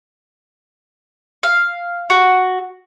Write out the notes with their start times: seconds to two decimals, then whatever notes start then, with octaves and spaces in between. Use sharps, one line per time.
1.43 F5
2.10 F#4